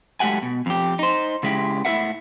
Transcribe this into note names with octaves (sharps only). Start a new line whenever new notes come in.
F#3 G#3 A3 G4 F#5 G#5
B2
F2 G4
D#4 C5
C#3 G#3 E4 G4
A2 E4 F4 A#4 E5 F#5